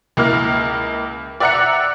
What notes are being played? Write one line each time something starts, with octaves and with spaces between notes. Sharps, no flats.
C#2 A#3 E4 F6
D5 E5 F#5 A#5 F#6 C#7